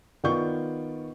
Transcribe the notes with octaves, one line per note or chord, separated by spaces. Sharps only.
D#3 B3 F4 D5 C#6 G6